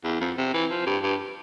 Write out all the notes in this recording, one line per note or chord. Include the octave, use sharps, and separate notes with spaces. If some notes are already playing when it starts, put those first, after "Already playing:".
E2
F2
C3
E3
F3
G2
G2